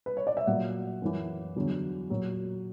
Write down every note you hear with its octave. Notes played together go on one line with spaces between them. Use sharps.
B4
C#5
D5
E5
A#2 F#3 F#5
F#2 E3
E2 D3 F#3
A#2 F#3